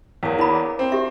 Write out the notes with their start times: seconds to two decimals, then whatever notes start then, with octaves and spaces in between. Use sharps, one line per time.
0.23 E2 A#3 C#5
0.39 D4 E4 B5
0.79 C4
0.92 G4 E5